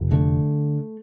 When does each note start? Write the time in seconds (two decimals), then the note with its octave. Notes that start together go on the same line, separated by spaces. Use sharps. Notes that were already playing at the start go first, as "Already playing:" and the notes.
Already playing: F1
0.11 D3 A3